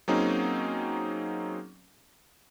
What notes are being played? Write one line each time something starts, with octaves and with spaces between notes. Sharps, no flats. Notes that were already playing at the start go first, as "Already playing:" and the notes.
F#3 A#3 C4 C#4 D#4 G#4